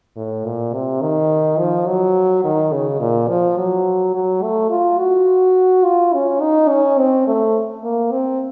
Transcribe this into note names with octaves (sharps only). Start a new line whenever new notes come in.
A2
A#2
C3
D#3
F3
F#3
D#3
C#3
A#2
F3
F#3
F#3
A3
F4
F#4
F4
C#4
D#4
C#4
C4
A3
A#3
C4